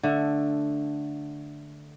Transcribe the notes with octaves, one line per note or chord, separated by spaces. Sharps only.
D3 A3